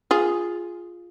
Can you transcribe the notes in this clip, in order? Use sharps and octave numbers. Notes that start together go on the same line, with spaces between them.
F4 G#4